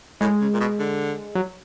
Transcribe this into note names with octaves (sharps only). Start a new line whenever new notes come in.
A2 G#3
C#3
A#2
B2
D3
F#3